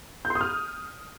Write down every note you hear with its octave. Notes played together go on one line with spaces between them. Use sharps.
G6
C6
D#6
F6